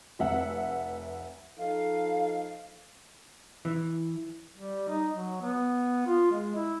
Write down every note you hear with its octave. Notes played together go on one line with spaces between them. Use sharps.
F1 E5 F#5
F3 D#4 A4 F5
E3
G3
D#4
F#3
B3
F4
G#3
E4